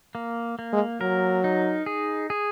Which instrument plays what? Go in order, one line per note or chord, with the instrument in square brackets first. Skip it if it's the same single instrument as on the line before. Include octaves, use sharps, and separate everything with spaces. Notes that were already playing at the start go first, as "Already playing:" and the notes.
[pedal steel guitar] A#3
A#3
[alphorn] G#3
[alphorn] F#3 [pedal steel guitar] A#4
[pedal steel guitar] D#4
G#4
G#4